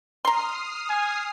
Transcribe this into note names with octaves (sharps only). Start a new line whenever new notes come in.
A#5 C6 D#6 F6 C7
G#5